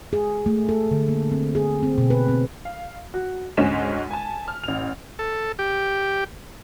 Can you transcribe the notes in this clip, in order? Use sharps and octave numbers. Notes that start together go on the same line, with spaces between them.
G#4
A3
A4
D3
A#3
C4
G#4
C4
B2
B4
C4
F5
F#4
D2 G#2 G#3 C#4 B6 E7
G#5 A5
F6
A1 F7
A4
G4